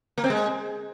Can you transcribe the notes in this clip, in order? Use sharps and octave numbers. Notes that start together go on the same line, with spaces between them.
A#3
C4
G#3